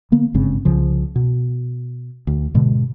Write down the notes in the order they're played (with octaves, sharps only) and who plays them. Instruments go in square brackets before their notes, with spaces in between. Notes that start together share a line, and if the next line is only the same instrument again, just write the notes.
[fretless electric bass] D3 A#3 B3
G1 G#2 C#3 C4
C2 C#3 F3
B2
D2
G#2 B2 D3 G#3